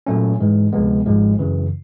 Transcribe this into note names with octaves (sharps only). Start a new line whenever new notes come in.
A#2 F#3 A3 C#4
G#2 E3 G#3
D2 C3 F3 G#3 B3
G#1 G#2 F3 G#3
F#2 C#3 E3